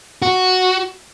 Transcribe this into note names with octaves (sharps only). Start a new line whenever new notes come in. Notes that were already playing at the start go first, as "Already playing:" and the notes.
F#4